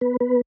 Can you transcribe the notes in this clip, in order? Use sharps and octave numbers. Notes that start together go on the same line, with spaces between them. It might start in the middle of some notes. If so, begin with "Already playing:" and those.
B3 B4
B3 B4